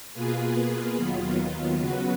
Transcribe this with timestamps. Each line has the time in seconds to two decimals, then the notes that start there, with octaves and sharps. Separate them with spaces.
0.13 B2 A#3 F4 G#4 B4
0.95 D#2 D#3 F#3 B3 F4
1.78 C#3 F#3 B3 F#4 B4